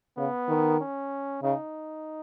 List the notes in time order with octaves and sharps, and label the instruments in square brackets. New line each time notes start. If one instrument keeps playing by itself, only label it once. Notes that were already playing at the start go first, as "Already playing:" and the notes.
[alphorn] C#3 [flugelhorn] B3
[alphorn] D#3
[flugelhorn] C#4
[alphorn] C#3 [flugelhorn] D#4